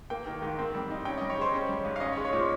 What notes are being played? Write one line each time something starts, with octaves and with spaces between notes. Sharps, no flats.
A#3 G5
D#3
G#2
C4
G3
D#4
C#4 G5
G3 D#5
C#5
C#3 C5
C#4
G3
G#2
F5
C#4 D#5
C#5
G#3
C#5
A#2 C5